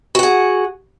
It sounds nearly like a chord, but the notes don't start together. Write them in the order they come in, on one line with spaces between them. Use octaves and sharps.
F#4 F#5 G#4